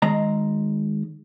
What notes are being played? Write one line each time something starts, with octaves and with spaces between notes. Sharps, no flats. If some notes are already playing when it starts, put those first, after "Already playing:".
D#3 G#3 A#5